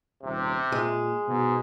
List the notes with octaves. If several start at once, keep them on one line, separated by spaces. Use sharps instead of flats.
D#1 C3
A#2 G#3
G#2 B2